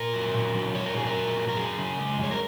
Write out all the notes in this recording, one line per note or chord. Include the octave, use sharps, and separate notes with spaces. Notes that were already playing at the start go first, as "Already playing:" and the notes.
Already playing: A#2 A#4
F#3
A#2
F#3
A#2 C#5
A#4
F#3 G#4
A#4
A#2
F#3
A#4
F#2 G#4
C#3
G#3
F#2
C#5
A#4